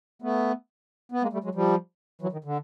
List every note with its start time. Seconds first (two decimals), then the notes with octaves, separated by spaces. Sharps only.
0.22 A3 B3
1.12 B3
1.22 G#3 A#3
1.33 G3 A3
1.44 F#3 G#3
1.55 F3 G3
2.21 E3 F#3
2.32 D#3
2.44 D3